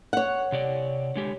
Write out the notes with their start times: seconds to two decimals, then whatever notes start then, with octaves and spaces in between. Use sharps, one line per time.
0.13 C#5 F#5
0.52 C3 G4 D5
1.16 D3 G#3 G4